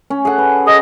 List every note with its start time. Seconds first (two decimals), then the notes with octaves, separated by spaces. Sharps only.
0.10 C#4
0.25 G#4 A4 F#5
0.38 B4
0.66 G#4 D#5